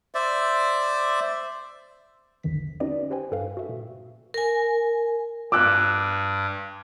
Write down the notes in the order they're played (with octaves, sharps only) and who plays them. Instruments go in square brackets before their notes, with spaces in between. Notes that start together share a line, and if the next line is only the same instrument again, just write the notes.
[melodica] C5 D5 E5
[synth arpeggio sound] A#1 E2 D3 D#3 B6
C#4 D#4 F#4 B4 D5 D#5
G4 B4 C5 G5 G#5
G2 A4 B4 F5
F#4 E5
A#2
[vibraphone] A#4 G#5
[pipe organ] G2 [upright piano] D6 E6 F#6